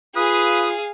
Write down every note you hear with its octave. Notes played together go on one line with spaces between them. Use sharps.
F4 G#4 B4 F5 D#6